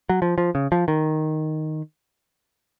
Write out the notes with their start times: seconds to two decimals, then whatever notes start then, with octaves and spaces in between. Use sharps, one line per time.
0.09 F#3
0.22 F3
0.38 F3
0.55 C#3
0.72 F3
0.88 D#3